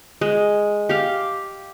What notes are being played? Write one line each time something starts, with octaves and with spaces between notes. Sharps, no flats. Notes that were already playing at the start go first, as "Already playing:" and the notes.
G#3
G4 F5